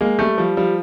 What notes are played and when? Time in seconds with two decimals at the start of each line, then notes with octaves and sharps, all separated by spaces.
0.01 G#3 A#3
0.19 G3 A3
0.38 F3 G3
0.57 F3 G3